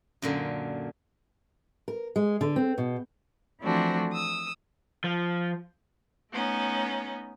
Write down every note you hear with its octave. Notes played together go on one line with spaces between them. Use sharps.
F#2 A#2 D3
A#4
G#3
D3
C4
B2
E3 F3 A3 C4 D4 F#4
D#6 E6
F3
A3 B3 C#4 D#4